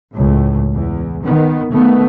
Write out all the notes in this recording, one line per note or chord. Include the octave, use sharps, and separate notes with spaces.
C#2 A2
E2
D#3 B3
D#3 A3 B3